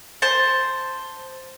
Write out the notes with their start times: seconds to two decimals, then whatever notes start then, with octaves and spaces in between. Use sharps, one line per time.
0.22 C5 A5